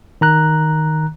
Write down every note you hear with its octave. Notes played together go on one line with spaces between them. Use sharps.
D#3 A#5 F#6